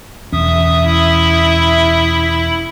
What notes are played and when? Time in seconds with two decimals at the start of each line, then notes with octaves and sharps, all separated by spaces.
0.33 E1 E2 C#4 E5 D#6
0.85 E4